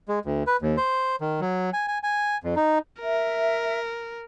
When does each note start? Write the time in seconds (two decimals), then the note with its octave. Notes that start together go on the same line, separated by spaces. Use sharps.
0.08 G#3
0.25 D2
0.47 B4
0.62 D#2
0.77 C5
1.21 D#3
1.41 F#3
1.73 G#5
1.88 G#5
2.03 G#5
2.44 F2
2.56 D#4
3.01 A#4 E5